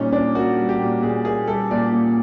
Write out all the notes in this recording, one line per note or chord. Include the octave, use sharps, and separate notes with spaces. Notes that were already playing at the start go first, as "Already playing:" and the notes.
Already playing: A#2 G3 C#4 D#4
A#2 D4
A#3 F#4
G3
G4
A#2
A#2 G#4
A#3 G#4
G3 A4
A#2 D5
A#2